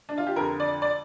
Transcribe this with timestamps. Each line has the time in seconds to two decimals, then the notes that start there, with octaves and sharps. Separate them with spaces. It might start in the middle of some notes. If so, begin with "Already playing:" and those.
0.09 D4
0.18 F4
0.27 G4
0.36 F2 D3 A#4
0.60 D5
0.82 D5